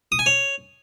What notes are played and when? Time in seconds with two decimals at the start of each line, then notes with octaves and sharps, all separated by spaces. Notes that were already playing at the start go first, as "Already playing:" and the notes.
0.12 D#6
0.19 G#5
0.26 C#5